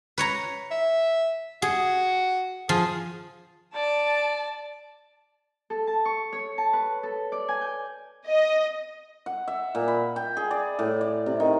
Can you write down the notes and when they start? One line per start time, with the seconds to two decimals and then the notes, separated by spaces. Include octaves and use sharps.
0.18 B4 C#5 A#5
0.71 E5
1.62 F#4 G#4
2.69 F3 G#4
3.74 D5 A5
5.70 A4
5.87 A5
6.05 C#6
6.32 C#5
6.58 A5
6.73 B4
7.03 A4
7.32 D5
7.48 G#5
7.61 G6
8.27 D#5
9.26 F#5
9.48 E5
9.75 A#2
9.88 B5
10.16 G5
10.37 G#4
10.51 D5
10.79 A2
11.01 D5
11.26 C3
11.40 D#3